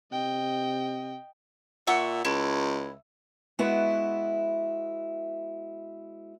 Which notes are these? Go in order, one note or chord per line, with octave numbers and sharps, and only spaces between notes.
C3 D#5 G5
A#2 E5 F#5 C#6
C#2 E4
G#3 B3 E4 F#4 B4 E5